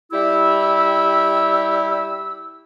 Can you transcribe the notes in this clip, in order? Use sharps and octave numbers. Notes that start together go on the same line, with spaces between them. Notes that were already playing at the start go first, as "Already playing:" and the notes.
G3 E4 G4 E5 E6